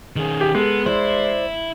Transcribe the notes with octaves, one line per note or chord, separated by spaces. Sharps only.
D#3 C#4 G#4
G4
G#3 B3 A4
E4 C5 D5